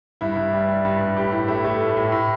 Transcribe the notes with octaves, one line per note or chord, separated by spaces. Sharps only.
G2 E4
G2
G3
G3
G2
G2
A2 G4
A2 E4
A3 E4
A3
A2
A2
A2